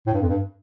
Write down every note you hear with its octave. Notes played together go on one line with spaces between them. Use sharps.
A2
G2
F2
G2